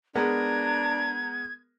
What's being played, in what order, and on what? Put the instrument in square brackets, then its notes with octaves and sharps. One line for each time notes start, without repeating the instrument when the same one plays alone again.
[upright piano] G#3 B3 A#4 [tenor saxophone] D4 [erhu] A#5 [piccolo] G#6